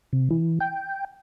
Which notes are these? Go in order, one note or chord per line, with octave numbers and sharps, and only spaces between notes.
C3
E3
G5